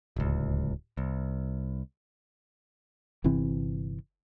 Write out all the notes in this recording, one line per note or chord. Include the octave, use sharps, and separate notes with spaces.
D1 C#2
C2
G1 C3 E3 C4